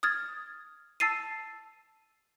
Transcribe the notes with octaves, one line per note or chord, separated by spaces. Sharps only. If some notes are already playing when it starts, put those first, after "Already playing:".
D#6 F6 G#6 A6
A5 E6 A6 C7 D#7